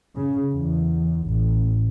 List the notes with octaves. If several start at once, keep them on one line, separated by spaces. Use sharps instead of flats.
C#3
E2
A1